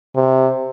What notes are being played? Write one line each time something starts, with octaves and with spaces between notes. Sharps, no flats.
C3